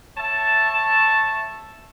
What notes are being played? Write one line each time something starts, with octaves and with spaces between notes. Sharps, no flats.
C#5 E5 A5